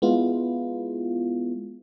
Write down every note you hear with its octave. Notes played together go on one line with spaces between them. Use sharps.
G#3 B3 E4 F4